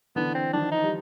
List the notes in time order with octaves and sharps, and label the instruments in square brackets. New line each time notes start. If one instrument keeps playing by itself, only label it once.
[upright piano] D3 E3 [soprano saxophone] B3
[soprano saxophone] C4
[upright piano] D#3 F3 [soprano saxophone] D4
[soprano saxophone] D#4
[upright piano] G3